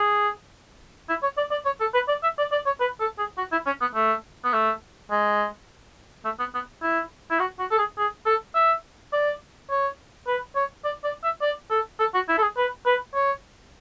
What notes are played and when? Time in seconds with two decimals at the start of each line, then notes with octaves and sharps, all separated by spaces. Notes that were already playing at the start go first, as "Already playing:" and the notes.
Already playing: G#4
1.09 E4
1.23 C#5
1.37 D5
1.51 D5
1.65 C#5
1.80 A4
1.94 B4
2.08 D5
2.23 E5
2.38 D5
2.52 D5
2.66 C#5
2.81 B4
3.00 A4
3.19 G#4
3.38 F#4
3.52 E4
3.66 C#4
3.81 B3
3.95 A3
4.44 B3
4.53 A3
5.11 G#3
6.25 A3
6.39 B3
6.55 B3
6.82 E4
7.31 E4
7.40 F#4
7.59 F#4
7.71 A4
7.79 G#4
7.98 G#4
8.26 A4
8.55 E5
9.13 D5
9.70 C#5
10.28 B4
10.56 C#5
10.84 D5
11.04 D5
11.24 E5
11.42 D5
11.70 A4
12.00 A4
12.14 F#4
12.29 E4
12.38 A4
12.42 G#4
12.57 B4
12.86 B4
13.15 C#5